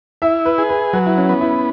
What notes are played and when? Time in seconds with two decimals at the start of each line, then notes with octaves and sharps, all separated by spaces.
0.22 E4 E5
0.45 B4
0.58 G#4
0.69 B4
0.93 F#3 B4
1.06 E4
1.17 C#4
1.29 B3
1.41 E4